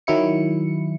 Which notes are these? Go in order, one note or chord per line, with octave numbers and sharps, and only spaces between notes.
D#3 F#3 E4 C#7